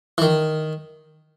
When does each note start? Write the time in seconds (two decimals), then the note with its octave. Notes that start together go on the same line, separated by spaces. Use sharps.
0.18 E3
0.22 D#3